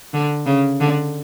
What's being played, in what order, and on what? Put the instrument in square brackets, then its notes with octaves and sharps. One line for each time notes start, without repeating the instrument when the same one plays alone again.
[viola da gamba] D3
C#3
D3